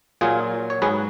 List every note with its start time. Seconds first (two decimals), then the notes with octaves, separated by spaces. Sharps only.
0.21 A#2 F#3 F4 G#4
0.70 C#5
0.82 G#2 F#3 G#4 B4